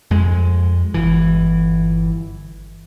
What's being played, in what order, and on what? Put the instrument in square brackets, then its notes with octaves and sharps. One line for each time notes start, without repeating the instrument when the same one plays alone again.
[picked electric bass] F2 G#3
G1 E3